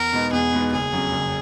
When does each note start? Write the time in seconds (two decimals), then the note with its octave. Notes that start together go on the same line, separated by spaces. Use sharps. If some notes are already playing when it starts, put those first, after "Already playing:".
Already playing: E2 A#4
0.13 B2 G#3 B3 D#4
0.33 E2 G#4
0.53 B2 G#3 B3 D#4
0.72 F#1 G#4
0.93 F2 C#3 F#3
1.12 F#1